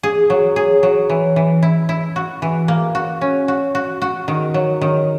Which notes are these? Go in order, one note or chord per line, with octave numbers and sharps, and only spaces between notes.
G#4
F#3
G#4
F#3
E3
E3
E4
E4
F#4
E3
A#3
F#4
C#4
F#4
F#4
F#4
D#3
F#3
D#3